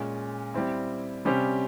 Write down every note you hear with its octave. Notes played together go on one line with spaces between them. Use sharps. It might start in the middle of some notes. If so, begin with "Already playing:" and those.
Already playing: A#2 G#3 C#4
G3 C4 E4
C3 G3 C#4 G4 C5